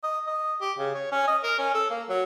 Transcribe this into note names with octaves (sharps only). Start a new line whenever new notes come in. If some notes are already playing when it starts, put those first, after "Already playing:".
D#5
D#5
G4
C#3
C#5
C#4
D#5
A#4
C#4
A4
A#3
F#3